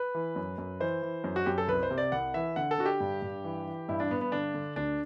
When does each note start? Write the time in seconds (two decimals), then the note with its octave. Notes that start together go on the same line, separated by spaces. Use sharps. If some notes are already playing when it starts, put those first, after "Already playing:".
Already playing: B4
0.15 E3
0.36 F#2
0.58 F#2
0.80 E3 C5
1.02 E3
1.24 F#2
1.36 F#4
1.46 F#2 G4
1.58 A4
1.68 C2 B4
1.83 C5
1.91 C3
1.98 D5
2.12 C2 F#5
2.34 E3 E5
2.56 D3 F#5
2.71 A4
2.78 D3 F#4
2.86 G4
3.00 G2
3.22 G2
3.44 E3
3.67 E3
3.89 G2 E4
4.00 D4
4.11 G2 B3
4.21 B3
4.32 D3 D4
4.54 D3
4.76 D2 D4